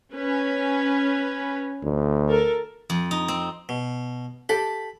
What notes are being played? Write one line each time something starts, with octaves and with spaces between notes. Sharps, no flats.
C#4 B4
D2
A4 A#4
F2
D#4
C4
B2
G4 A4 B5